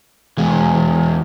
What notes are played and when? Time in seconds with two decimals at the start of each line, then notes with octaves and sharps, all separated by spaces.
0.38 E2 G#3